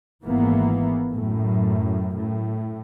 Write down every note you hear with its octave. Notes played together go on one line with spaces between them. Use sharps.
G#1 E3 A#3 B3
F#2 A2
A2